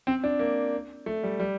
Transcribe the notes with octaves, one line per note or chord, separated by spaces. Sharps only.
C4
D4
A#3
A3
G3
G3